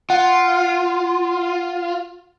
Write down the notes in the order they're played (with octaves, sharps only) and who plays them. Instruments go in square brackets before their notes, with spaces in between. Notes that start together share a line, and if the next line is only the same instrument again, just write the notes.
[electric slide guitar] F4 [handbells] F#5